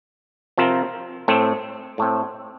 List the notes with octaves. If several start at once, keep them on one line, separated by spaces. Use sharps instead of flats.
C3 F3 C4 F4 A#4
A2 A3 C4
A2 A3 C4